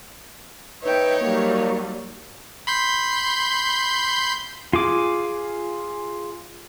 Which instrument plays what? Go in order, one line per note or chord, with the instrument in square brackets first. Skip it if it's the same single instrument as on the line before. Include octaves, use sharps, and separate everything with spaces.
[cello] D#4 C#5 [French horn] B4 [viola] E5 G5
[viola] F#3 G3 [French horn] A#3
[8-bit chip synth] B5 C6 G6
[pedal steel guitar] F4 G#4 D6